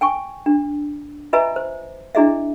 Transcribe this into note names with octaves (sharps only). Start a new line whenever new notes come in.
G5 G#5 C#6
D4
F4 B4 D#5 E5 G#5 A#5
C5
D4 E4 G#4 D#5 E5